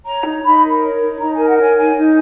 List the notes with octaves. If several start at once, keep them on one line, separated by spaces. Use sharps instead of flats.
C#5 A#5
D#4
D#4 B5
A#4
C#5
D#4
D#4 A#5
A#4 G#5
F#5
C#5 G#5
D#4 G#5
D#4